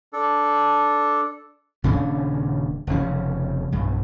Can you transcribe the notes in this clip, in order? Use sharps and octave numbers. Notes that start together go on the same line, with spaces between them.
D4 A4
D#1 C#3 C#4 D4
F1 C#3 F3 C#4
B1 G2